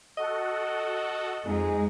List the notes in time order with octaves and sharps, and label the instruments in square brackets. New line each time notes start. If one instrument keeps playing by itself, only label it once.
[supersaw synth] F#4 A4 F#5 [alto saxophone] D#5
[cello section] F2 G#3 [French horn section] D#4 G#4